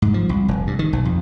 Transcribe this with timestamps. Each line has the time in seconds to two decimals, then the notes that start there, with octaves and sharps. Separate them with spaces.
0.02 G#2
0.14 F3
0.29 C2
0.48 F1
0.67 G2
0.79 D#3
0.93 B1
1.05 F2